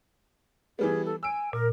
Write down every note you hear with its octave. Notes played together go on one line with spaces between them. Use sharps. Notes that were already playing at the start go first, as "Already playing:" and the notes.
E3 G3 B3 G#4
A4
G#5 E6 D7
A#2 A#4